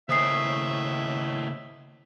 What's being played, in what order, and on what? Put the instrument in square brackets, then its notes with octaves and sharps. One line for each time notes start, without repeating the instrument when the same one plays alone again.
[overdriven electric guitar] D#2 A2 [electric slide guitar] C#3 G#5 [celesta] C5 D#6 C7 [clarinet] E5